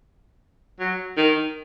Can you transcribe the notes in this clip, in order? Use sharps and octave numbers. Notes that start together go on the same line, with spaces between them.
F#3
D#3